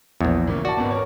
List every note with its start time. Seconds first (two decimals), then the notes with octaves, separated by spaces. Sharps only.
0.21 A#1 E2
0.47 A#2 C#3 C#4
0.65 F#4 D5 A5
0.77 G#1 E2
0.91 A#4 C#5